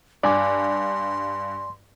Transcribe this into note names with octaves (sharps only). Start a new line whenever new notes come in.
G2 D5 G#5 C6 D6